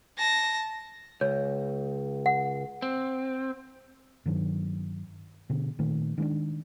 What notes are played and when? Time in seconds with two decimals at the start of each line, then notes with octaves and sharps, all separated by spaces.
0.18 A5 A#6
1.21 C#2 C#5
2.26 F#5
2.82 C4
4.26 G2 D#3 F#3
5.50 B2 D3
5.79 A#2 D#3 A3
6.18 D#3 G#3 A#3 D4